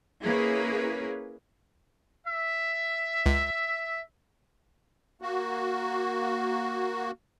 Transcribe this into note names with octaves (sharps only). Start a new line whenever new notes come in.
A#3 C#4 E4 G#4 B4
E5
C#2
A#3 F#4